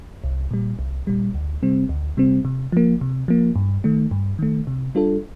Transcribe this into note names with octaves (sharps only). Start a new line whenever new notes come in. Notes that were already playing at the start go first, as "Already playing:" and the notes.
C2
A#2 G3
C2
A#2 G3
D2
C3 G3 C4
D2
C3 G3 C4
C3
F3 A#3
C3
F3 A#3
G2
D#3 A3
G2
D#3 A3
C3
G3 D4 F4 A4